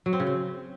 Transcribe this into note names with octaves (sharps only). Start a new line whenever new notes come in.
F#3
C4
C#3
C4